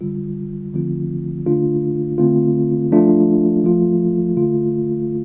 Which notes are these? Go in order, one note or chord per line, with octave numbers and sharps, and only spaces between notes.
D3 G3 F4
D3 F3 A3 C4 F4
D3 A3 D4 F4
D3 A3 C4 F4
F3 A3 D4 F4
F3 A3 F4
D3 A3 F4